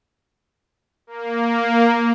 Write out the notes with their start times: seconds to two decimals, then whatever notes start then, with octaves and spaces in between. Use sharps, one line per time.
1.07 A#3